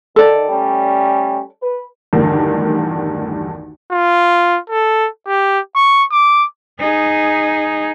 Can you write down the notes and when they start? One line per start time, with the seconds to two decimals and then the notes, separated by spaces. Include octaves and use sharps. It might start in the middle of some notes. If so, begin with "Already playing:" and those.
0.16 D#3 A4 D5
0.49 G3 A3 C#4
1.63 B4
2.13 B1 E2 G2 D3 D#3 A3
3.91 F4
4.70 A4
5.28 G4
5.76 C#6
6.11 D6
6.79 D#4 G#4